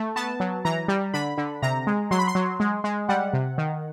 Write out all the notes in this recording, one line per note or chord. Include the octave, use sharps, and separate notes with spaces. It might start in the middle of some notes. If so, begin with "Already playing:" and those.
Already playing: A3
B3 A5
F#3
E3 A#5
G3
D3 B5
D3
C3 A#5
G#3
F#3 C6
B5
C6
F#3
G#3
G#3
G3 F#5
C3
D#3